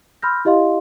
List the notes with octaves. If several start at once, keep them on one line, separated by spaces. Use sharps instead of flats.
B5 C6 E6 F6 G6 A#6
E4 G4 D#5 F5 C6